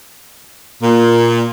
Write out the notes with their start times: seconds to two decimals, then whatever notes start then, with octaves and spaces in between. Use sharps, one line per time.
0.83 A#2